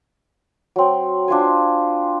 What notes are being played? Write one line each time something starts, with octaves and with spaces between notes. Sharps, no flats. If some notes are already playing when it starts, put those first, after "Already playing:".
F#3 C4
D4 F4 C5 G#5